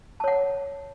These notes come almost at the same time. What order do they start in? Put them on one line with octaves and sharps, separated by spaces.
A5 C#5 F#5